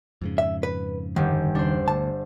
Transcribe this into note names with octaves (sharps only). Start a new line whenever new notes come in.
F2 G#2 C#3
E5
B4
G1 D#3 G4
E2 C#3 G3 D4 C5
D2 A5